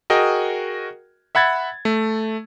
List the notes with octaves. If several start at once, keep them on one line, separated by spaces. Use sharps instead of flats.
F#4 G#4 A#4 D#5 G5
E5 F#5 B5 G#6 A6
A3